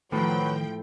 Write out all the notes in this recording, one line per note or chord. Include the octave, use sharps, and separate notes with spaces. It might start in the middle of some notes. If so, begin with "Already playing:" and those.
A2 D#3 F3 F#3 B4 G5